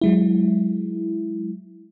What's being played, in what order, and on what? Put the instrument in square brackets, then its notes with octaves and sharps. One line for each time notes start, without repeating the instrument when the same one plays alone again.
[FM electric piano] F#3 G#3 E4